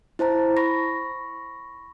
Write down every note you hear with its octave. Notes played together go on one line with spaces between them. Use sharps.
E4 C5 A5 A#5
B5 C#6 A#6